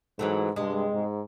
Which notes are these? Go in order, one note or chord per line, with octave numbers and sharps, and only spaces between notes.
G#2 E3 F#3 A3
G2 C3 G#3
G#2